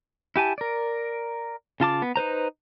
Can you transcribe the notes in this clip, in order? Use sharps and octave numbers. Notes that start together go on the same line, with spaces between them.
E4 G4 G#5 A5
A#4 D5
C#3 F4 A5 D6
B3
D#4 B4 C5 A#5